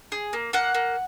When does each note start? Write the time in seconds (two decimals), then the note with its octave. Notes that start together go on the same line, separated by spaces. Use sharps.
0.12 G#4
0.33 A#3
0.53 A#3 F#5
0.74 A#3